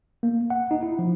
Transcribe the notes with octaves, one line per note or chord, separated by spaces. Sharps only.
A#3
F#5
D#4
E4
F3